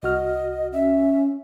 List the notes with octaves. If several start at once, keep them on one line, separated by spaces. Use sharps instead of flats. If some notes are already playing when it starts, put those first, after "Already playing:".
C2 F#4 D#5 F6
C#4 E5